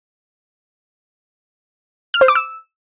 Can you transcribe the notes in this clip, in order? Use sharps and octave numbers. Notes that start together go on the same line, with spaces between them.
F6
C5
D6
E6